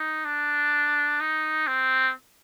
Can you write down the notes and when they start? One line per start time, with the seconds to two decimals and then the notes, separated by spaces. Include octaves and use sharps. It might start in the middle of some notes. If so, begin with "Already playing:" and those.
Already playing: D#4
0.25 D4
1.21 D#4
1.67 C4